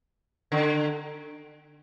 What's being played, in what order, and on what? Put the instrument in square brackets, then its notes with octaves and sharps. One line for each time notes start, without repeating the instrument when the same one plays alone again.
[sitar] D3